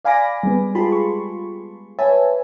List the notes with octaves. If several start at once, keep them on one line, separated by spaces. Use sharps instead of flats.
D5 F5 G#5 B5 D6 A#6
G3 G#3 B3
F4 G4 G#4 A5 B5 C6
C#6
B4 C#5 E5 G#5 A5